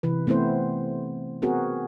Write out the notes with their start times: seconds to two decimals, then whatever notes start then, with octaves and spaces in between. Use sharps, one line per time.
0.03 C3 E3 B4
0.27 A3 B3 C4 E4 C5
1.42 B3 C4 F#4 G#4 A#4